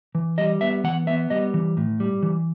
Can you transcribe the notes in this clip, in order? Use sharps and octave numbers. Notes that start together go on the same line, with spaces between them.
E3
G3 D#5
B3 E5
E3 F#5
B3 E5
G3 D#5
E3
A2
G3
E3